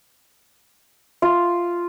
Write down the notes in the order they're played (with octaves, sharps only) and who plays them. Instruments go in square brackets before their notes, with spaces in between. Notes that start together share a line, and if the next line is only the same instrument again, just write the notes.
[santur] F4